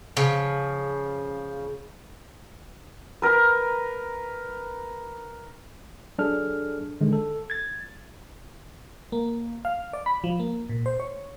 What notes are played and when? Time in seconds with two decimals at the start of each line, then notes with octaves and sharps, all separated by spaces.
0.17 C#3 F3
3.22 A#4 B4
6.18 F#3 D4 G#4 A4 F6
7.01 D3 D#3 G#3
7.13 A4
7.50 G#6 A6
9.12 A#3
9.65 F5
9.93 D5
10.06 B5
10.24 F3
10.40 A#3
10.69 A#2
10.86 C5
11.00 C#5